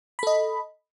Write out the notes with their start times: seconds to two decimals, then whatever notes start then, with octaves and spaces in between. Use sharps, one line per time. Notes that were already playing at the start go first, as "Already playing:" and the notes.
0.19 B5
0.23 A4
0.27 D#5